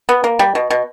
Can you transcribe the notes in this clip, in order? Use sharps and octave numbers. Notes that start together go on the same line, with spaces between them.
B3
A#3
G3
B2
B2